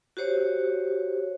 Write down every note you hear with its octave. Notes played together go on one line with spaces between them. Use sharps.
F#4 G4 C5 C#5